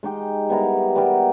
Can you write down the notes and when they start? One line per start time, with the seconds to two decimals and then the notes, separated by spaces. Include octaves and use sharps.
0.03 G#3 D#4 G4
0.49 G3 B3 E4 A#4
0.95 G3 B3 G4 A#4